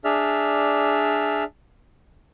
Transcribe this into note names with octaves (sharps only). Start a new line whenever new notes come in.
D4 G#4 D5 E5 F6